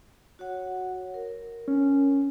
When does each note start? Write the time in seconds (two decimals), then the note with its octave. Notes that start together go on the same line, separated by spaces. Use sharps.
0.39 F#4 C#5 F#5
1.14 A#4
1.68 C#4